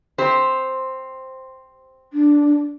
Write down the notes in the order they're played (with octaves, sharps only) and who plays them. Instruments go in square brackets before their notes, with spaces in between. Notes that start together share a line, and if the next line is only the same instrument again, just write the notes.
[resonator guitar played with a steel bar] C4 G4 C5
[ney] D4